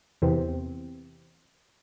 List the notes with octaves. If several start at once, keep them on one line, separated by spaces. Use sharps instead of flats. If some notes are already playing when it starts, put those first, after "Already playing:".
E2 C3 E3 C4